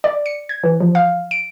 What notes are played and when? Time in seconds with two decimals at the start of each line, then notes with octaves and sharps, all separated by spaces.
0.04 D5
0.26 C#7
0.49 G#6
0.64 E3
0.80 F3
0.95 F5
1.31 D7